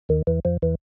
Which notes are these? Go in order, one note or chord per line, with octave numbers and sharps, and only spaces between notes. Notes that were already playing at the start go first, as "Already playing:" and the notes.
D#2 D#3
E2 E3
F2 F3
E2 E3